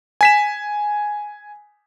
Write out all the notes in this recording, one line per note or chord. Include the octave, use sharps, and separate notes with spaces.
G#5 B6 E7